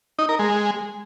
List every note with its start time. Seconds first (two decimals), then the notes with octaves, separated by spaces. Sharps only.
0.19 D#4
0.29 A#4
0.39 G#3